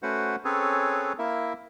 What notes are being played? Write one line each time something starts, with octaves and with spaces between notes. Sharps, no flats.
A3 C#4 F#4 B4 C5 F#5
C4 C#4 G#4 A4 B4 C#5
A#3 E4 A#4 E5